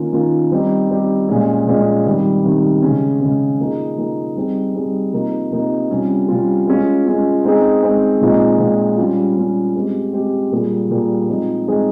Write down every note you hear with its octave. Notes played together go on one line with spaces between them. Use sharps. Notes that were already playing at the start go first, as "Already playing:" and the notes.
Already playing: D#3 A#3 C#4 F4
D#3 A#3 C#4 F4
G3 C4 D#4 G4
G3 C4 D#4 G4
A#2 F3 G#3 C#4
A#2 F3 G#3 C#4
C3 D#3 G3
C3 D#3 G3
C#3 G#3 C#4
C#3 G#3 C#4
F3 A#3 D#4 G#4
F3 A#3 D#4 G#4
G3 C4 D#4 G#4
G3 C4 D#4 G#4
C3 F3 A#3 D#4
C3 F3 A#3 D#4
C3 G3 C#4 F4
C3 G3 C#4 F4
G#3 C#4 F4
G#3 C#4 F4
G#3 C4 D#4 G#4
G#3 C4 D#4 G#4
A#2 F3 G#3 C4 D#4
A#2 F3 G#3 C4 D#4
G3 C#4 F4
G3 C#4 F4
G#3 C4 G4
G#3 C4 G4
A#2 G3 A#3 F4 G#4
A#2 G3 A#3 F4 G#4
F3 G#3 C4 D#4 G#4
F3 G#3 C4 D#4 G#4